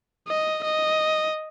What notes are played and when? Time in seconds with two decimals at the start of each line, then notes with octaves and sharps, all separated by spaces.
0.28 D#5
0.64 D#5